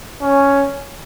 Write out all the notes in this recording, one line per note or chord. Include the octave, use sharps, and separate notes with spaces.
C#4